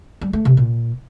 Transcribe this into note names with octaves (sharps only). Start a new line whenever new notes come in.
G3
A3
C3
A#2